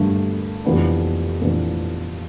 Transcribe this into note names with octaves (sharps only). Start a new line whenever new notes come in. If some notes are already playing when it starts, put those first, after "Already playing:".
Already playing: G2 D3 A3
F1 F2 E3 B3 D4
F1 F2 E3 B3 D4